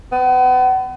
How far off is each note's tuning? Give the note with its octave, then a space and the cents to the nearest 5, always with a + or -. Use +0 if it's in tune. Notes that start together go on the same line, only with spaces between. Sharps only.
B3 +35